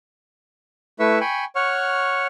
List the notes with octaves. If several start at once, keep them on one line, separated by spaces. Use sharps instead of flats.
A3 E4 B4 E5 C#6 E6
G5 G#5 B5 C#6
C#5 F#5 C#6 F6